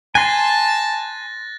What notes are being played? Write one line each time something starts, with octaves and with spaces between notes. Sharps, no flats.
G#5 A5 C6 F#6 A6 A#6